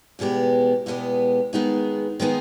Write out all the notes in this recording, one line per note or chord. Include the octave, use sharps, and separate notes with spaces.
E2 B2 G#3 B3 G4
E2 B2 G#3 B3 G4
D#3 G#3 B3 D#4 G#4
D#3 G#3 B3 D#4 G#4